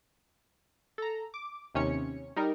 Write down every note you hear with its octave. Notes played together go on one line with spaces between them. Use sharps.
A4 A#5
D6
D#2 C3 C#4 C#5 C#7
G3 D#4 A#4